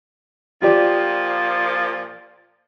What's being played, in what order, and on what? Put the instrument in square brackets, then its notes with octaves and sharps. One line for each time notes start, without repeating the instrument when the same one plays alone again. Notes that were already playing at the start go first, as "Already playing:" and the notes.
[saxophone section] A#2 F3 [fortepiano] F4 G4 D5